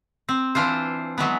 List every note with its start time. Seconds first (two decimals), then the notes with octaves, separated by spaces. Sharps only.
0.29 C4
0.55 E3 D4 F4 C5
1.18 E3 F#3 G#3 B3